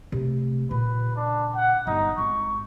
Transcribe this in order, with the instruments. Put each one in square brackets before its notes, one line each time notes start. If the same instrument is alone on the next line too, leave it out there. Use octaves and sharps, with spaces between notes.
[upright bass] C3 A3
[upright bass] A#2 C#3 [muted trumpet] B4
[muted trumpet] D4
F#5
[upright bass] G1 [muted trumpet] D#4
[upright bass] G#1 [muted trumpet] C#6